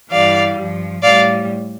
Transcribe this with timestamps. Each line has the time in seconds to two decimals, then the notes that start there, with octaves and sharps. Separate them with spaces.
0.10 G2 E3 G3 D5 F5
0.56 G2 F3
1.02 A2 G3 D5 F5